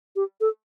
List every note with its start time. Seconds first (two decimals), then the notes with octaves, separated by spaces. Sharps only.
0.16 G4
0.41 A4